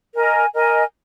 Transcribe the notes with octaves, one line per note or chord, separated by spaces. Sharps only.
A#4 D#5 G#5
A#4 D#5 G#5